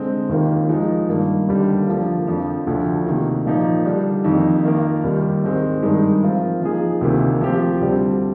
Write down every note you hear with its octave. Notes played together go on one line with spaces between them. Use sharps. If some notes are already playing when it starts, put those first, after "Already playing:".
Already playing: D3 G#3 C4
D#2 D#3 A#3 F4
F3 G#3 D#4
G2 D#3 A#3
D#2 D3 G3
D3 F3 A#3
F2 D3 F3
D2 D3 F3
C3 D#3 A#3
A#2 F3 A#3 D#4
D3 G3 D4
F2 D#3 A#3 D#4
D#3 A#3 F4 A#4
D#2 D#3 G3
G#2 D#3 G#3 C4
G2 D#3 G#3 D#4
F3 C4 F4 A#4
F3 A#3 D#4 G#4
D2 C3 D#3 A#3
F3 C4 G4
D2 D3 G3 C4